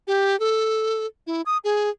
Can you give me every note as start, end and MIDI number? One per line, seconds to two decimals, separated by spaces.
0.07 0.38 67
0.40 1.06 69
1.27 1.42 64
1.46 1.58 87
1.64 1.90 68